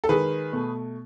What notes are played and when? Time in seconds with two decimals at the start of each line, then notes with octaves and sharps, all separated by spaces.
0.04 A4
0.09 D#3 G#3 G#4 B4
0.52 B2 A3